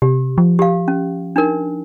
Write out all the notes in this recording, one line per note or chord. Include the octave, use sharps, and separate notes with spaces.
C3 G4
F3
G4 F5
C#4
D4 D#4 A#4